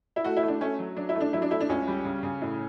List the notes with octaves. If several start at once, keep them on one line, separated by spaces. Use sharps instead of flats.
E4
A3 F#4
E4
A3
D4
A3 C#4
F#3
F#3 D4
E4
A3
D4
F#3 E4
D4
A3 E4
D4
C#2 C#4
G3
C#3
C#3
A2